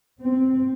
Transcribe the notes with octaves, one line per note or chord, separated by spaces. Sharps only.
C4